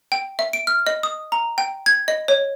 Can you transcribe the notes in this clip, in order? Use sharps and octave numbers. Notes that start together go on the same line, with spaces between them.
G5
E5
D7
F6
D#5
D#6
A#5
G5
G#6
D#5
C#5